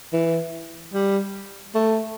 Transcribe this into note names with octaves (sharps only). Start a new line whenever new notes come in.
E3
G3
A3